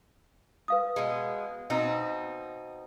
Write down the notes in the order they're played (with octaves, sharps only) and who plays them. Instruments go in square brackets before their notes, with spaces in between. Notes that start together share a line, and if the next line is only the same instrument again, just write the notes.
[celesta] B4 F5 D#6
[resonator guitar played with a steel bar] B2 G#3
B2 C4 D#4